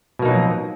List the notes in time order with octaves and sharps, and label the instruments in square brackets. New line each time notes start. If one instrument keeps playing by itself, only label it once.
[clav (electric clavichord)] B2
A#3
D#4
F#3
F3